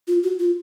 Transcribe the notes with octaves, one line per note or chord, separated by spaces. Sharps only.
F4
F#4
F4